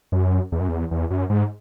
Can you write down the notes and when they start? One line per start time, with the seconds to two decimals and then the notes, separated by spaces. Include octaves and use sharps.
0.12 F#2
0.52 E2
0.60 F#2
0.68 E2
0.91 E2
1.10 F#2
1.30 G#2